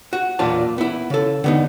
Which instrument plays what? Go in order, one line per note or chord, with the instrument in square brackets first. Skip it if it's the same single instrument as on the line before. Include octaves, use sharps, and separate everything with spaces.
[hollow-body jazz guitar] F#4
B1 E2 A#2 D4 F4 A5
B3 E4
C#3 A4
D3 B3 D#4